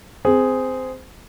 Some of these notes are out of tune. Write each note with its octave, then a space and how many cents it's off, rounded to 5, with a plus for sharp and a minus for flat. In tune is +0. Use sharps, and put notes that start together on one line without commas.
C4 -20 G#4 +0